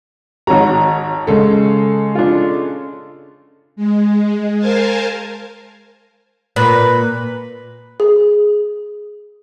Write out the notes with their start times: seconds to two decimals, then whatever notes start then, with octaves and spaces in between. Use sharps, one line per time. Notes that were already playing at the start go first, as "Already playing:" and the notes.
0.47 G#1 F#4 C#5 A#5
1.27 C#3 G#3 A4
2.15 D4 F4
3.76 G#3
4.59 A#4 C5 F5 G#5 A5
6.56 A#2 B4
8.00 G#4